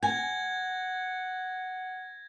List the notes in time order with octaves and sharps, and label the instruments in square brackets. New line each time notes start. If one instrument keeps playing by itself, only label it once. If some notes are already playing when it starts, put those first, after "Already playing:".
[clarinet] F#5 [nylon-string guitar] G#5 [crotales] G#6 A#6